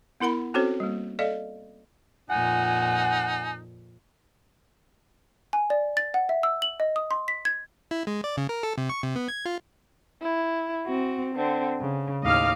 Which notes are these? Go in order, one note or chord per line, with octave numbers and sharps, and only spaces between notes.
B3 E4 A#4 F#5 B5
C4 C#4 F#4 A4 C5 C#5
G3 A#3
A4 D5 D#5 F5
F2 A#2 D#4 F#5 G#5
G#5
D5
A6
F#5
E5
E6
F#7
D#5
D#6
C6
B6
G#6
E4
G#3
D5
C#3
A#4
A4
C3
C#6
C3
B3
G#6
F4
E4
C4 F#4
D3 C4
C#3
D#2 A2 D#5 F5 D6 F6